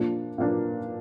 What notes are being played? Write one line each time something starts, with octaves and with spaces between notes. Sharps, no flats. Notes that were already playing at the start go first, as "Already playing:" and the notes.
Already playing: A#2 F3 A#3 D4
A#2 F3 A#3 D4